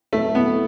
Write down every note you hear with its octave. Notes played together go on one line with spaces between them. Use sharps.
A3
B3